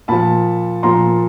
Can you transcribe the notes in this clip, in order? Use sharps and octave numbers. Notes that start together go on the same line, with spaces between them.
A#2 F3 A5 B5
A#2 F3 A#5 C6